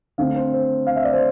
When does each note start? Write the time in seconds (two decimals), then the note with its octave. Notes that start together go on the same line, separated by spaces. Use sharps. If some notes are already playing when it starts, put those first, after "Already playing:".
0.18 D3 A3 C4 F5
0.35 C5
0.53 C5
0.87 F5
0.96 E5
1.05 D5
1.13 C5